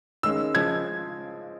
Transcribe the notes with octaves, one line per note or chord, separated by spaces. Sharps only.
D#3 G#3 C#4 E6
C#3 F3 G#3 G#6